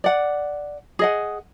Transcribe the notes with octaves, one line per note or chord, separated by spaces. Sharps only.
D5 F#5
G#4 D#5 F#5